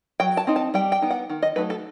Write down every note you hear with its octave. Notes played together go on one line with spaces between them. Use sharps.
F#3 G5
A5
C4 D#4
A5
G3 G5
G5
B3 D#4
F#5
D#3
D#5
F#3 A3 D#4 B4
A4